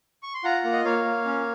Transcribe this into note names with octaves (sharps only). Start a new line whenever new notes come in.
C#6
C6
F4 F#5 A#5
A#3
D#5
A#3 C#5 F5
A#3
C#4